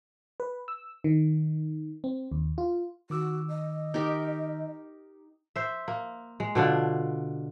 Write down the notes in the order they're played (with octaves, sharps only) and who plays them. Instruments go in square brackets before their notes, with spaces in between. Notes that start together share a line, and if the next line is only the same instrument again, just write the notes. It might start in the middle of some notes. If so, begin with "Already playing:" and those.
[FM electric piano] B4
E6
D#3
C4
D#2
F4
[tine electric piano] D#3 D6 E6 [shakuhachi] F#4
[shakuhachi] D#5
[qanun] D#4 G4 A#4
[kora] C5 E5
A#3
G#3
B2 D3 D4 F4